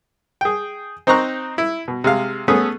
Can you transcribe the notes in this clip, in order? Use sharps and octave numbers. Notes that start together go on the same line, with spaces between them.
G#4 G5
C4 D#4 C5 A#5 C#6 F#6
E4
B2
C3 G#3 F5
A3 B3 C#4 G#4